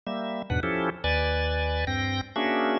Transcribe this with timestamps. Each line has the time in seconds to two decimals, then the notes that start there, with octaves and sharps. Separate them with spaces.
0.07 G3 A#3 E5
0.50 E2 G#2 B2 D4 B4 F#5
0.63 F3 C#4 E4 G4 A4
1.04 D#2 B4 D5 G#5 A6
1.87 G2 C4 G5 A#6
2.36 A#3 C#4 D4 F#4 G#4 E5